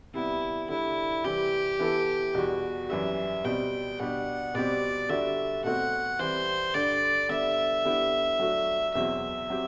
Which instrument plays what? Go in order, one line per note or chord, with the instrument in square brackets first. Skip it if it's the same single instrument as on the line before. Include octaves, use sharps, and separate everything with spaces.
[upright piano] C3 G3 B3 [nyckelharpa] E4
[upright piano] D3 G3 D4 [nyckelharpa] E4
[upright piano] C3 E3 G3 C4 [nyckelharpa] G4
[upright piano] E3 B3 E4 A4
[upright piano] E2 B2 G3 [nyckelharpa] F#4
[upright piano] F#2 E3 G3 [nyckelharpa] E5
[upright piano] B2 G3 C4 [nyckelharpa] G5
[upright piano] B2 G3 D4 G4 [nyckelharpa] F#5
[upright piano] B2 G3 C4 G4 [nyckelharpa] D5
[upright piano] D3 G3 D4 F#4 [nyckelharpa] E5
[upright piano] B2 A3 C4 F#4 [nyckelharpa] F#5
[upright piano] E3 G3 C4 [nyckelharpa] C5
[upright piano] G2 D3 G3 [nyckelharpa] D5
[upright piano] D3 G3 B3 D4 [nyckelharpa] E5
[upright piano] D3 G3 B3 E4 G4
F#3 A3 D4 F#4
[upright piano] E2 B2 F#3 C4 [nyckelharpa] E5
[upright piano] F#3 C4 G4